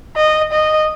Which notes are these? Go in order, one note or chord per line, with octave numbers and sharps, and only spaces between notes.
D#5
D#5